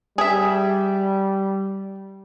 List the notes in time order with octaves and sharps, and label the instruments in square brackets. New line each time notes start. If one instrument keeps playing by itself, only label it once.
[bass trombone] G3 [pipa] G#4 E5